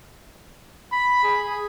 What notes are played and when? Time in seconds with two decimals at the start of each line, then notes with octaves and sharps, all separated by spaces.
0.92 B5
1.24 G#4